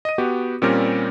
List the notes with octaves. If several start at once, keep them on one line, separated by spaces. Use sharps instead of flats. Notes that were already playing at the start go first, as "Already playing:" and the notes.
D#5 D#7
B3 F#4 G4
A#2 G3 C4 C#4 G4 A#4